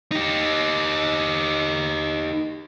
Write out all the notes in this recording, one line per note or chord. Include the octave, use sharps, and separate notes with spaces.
D#4 G4